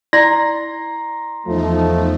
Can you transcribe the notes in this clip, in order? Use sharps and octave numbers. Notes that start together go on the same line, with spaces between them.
E4 D5 A#5 C6 A#6
E2 F3 A3 D#4